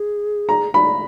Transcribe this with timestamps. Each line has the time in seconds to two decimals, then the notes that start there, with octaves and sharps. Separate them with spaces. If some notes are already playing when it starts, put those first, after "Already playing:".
Already playing: G#4
0.49 A#5
0.74 B5